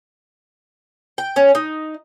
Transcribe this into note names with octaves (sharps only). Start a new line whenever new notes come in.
G5
C#4
D#4